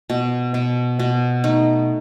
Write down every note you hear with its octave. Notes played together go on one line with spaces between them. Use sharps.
B2
B2
B2
A3 D#4